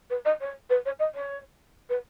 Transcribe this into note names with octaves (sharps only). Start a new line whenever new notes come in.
B4
D#5
C#5
B4
C#5
D#5
C#5
B4